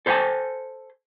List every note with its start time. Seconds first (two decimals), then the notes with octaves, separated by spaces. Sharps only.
0.06 A4 C5 E5 F#5 G#5 A5